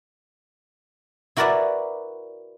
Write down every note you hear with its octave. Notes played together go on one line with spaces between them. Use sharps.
E4 F#4 A#4 B4 D5 E5